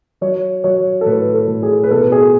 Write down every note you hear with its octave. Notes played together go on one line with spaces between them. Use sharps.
F#3 C#5
F#3 C#5
A4
A2 B4
A4
A2
G#4
B4
B2 A4
G#4